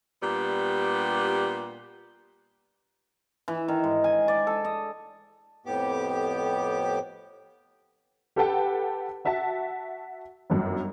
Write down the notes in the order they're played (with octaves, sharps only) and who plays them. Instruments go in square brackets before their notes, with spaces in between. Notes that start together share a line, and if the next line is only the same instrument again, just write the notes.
[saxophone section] A#2 G3 B3 D4 G4
[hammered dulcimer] E3
D#3
G#2
G#5
D5
A4
D#5
[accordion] F2 A2 B3 G4 D6
[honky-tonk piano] G4 A4 B4 F#5 G5 A5
F#4 E5 F#5 A5
G1 F#2